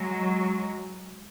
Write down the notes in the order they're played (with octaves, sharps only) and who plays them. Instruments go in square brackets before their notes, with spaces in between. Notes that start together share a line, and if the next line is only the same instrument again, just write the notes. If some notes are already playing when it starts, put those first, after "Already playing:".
Already playing: [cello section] F#3 G#3